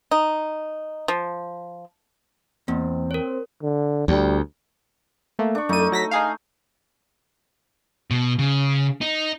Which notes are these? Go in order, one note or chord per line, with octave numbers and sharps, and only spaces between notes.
D#4
F3
E2 A#3 C4
A#4 C#5
D3
D2 G3
A3 A#3
D4 C#6
F#2 A3 D#4 D#7
F#3 A#6 B6
D#4 G#4 F5
B2
C#3
D#4